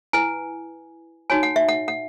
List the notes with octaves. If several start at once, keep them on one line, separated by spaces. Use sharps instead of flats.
E4 B4 G#5
D#4 F#4 C#5 G#5
F#5
E5
F#5
F#5